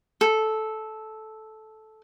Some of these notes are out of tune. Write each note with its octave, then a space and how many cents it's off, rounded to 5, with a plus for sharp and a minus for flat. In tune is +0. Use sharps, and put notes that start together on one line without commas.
A4 -10